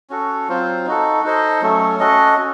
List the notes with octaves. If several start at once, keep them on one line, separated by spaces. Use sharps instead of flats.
C#4 F#4 A4
F#3 C4 F4 C5
D#4 F#4 A4
D#4 A4 C5 D#5
F#3 A3 C#4 A4
C#4 F#4 A4 D#5
C#4